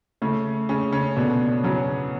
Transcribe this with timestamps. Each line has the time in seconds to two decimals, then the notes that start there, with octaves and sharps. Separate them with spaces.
0.22 C#3 A3 C#4
0.69 C#3 C#4 G#4
0.92 C#3 C#4
1.16 B2 D3 D4
1.64 C#3 F#3 C#4